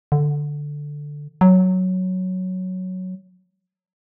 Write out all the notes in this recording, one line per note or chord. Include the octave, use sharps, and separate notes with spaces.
D3
F#3